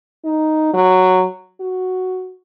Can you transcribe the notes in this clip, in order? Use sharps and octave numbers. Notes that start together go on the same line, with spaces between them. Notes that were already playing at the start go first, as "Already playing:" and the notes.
D#4
F#3
F#4